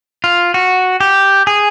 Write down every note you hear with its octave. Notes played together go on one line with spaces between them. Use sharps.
F4
F#4
G4
G#4